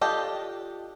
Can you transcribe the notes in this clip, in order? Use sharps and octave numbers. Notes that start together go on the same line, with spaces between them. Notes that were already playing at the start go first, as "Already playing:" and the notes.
D4 F4 G4 A4 D#5